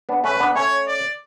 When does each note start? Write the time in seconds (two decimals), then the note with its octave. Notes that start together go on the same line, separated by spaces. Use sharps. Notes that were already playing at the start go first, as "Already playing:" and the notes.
0.09 B3 D4
0.24 A3 C#4 B4
0.40 B3 D4
0.56 A3 C#4 C#5
0.88 D5